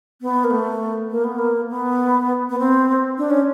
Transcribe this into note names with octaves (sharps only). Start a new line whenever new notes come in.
B3
A#3
A3
A#3
B3
A#3
B3
B3
C4
D4
C#4